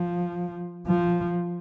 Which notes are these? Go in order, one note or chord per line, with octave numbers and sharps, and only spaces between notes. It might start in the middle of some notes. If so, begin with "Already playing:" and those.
Already playing: F3
F3